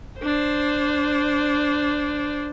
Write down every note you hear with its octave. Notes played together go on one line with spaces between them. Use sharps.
D4 C5